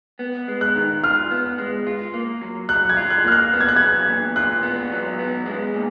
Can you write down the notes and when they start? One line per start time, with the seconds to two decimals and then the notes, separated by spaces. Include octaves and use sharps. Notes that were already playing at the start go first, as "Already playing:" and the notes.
0.19 B3
0.48 G#3
0.61 F#6
0.76 D#3
1.03 F4 F6
1.31 B3
1.58 G#3
1.87 F4
2.14 A#3
2.41 F#3
2.69 F#3 F#6
2.89 G#6
2.97 F4
3.10 F#6
3.25 A#3 F6
3.32 F#6
3.53 B3
3.61 G#6
3.69 F#6
3.76 F#3 G#6
4.07 A#2
4.36 F4 F#6
4.63 B3
4.91 F#3
5.19 B3
5.46 G#3
5.74 A#2